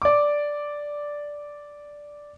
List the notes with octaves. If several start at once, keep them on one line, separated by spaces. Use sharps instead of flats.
D5 D6